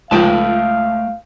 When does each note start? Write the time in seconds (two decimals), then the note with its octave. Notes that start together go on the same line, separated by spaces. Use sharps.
0.11 C#2 F3 A3 F5 G5 A5